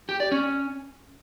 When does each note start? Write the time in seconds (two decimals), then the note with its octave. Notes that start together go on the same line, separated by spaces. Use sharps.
0.09 G4
0.20 D5
0.32 C#4